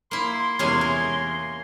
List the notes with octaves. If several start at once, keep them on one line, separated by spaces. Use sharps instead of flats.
A#3 E4 C6
C6
E2 C3 G#3 A#3 C#4 G#6 C7
A#4